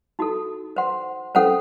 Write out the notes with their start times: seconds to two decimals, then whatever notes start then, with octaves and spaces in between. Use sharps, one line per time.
0.19 D#4 F#4 A4
0.76 C5 F#5 C6
1.35 C#4 A4 C5 F#5